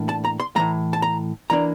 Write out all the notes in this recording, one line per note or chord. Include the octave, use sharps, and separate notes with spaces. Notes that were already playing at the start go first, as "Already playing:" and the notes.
Already playing: A2 E3 A#3 D4
A5
A#5
C6
A2 E3 A3 A#5
A5
A#5
E3 A#3 D4 A#5